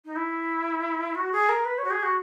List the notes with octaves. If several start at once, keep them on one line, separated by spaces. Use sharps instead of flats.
D#4
E4
F#4
G#4
A#4
B4
C#5
F#4
G#4
F#4